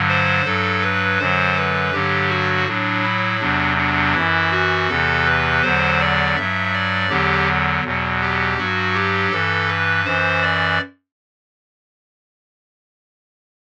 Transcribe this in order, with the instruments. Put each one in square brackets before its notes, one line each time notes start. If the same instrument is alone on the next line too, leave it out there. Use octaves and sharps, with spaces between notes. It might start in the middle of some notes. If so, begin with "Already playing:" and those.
Already playing: [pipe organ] G2 D3 F#3
C5
G2 F#3 A4
B4
F#2 D3 F#3 C5
B4
G2 D3 F#3 G4
F#4
A2 F#3 D4
E4
E2 C3 F#3 D4
D4
F#2 E3 E4
F#4
E2 C3 E3 A4
B4
E2 D3 F#3 C5
D5
G2 F#3 E5
D5
E2 D3 F#3 G4
E2 B2 F#3
G4
G2 F#3 F#4
G4
G2 E3 A4
B4
F#2 E3 C5
D5